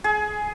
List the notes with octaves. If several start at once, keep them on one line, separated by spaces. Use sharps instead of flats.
G#4